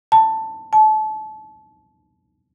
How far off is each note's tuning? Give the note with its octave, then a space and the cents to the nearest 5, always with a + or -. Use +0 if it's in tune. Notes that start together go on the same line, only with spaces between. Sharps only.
A5 +10
A5 -30